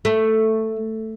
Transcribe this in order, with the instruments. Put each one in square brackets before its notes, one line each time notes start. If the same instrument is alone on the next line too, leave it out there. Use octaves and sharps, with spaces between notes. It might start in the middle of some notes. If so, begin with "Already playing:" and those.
[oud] A3